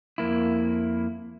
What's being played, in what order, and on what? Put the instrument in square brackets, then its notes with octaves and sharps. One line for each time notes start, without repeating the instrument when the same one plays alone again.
[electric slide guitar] F2 A#3 E4